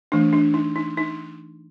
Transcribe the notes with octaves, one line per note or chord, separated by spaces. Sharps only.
E3 A3 D4
D4
D#4
D#4
D#4